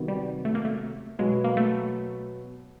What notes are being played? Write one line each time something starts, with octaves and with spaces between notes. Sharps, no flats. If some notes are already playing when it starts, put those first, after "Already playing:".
Already playing: C3 D#3 F#3 B3
G3
A3
A#3
A3
B2 F#3 G#3 B3
A#3
A3